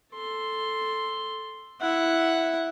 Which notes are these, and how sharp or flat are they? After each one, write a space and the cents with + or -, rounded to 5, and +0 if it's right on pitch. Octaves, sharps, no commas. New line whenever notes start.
A4 +0 C6 +0
E4 +0 F#5 +0